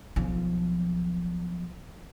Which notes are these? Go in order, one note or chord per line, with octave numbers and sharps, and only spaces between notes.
B1 F3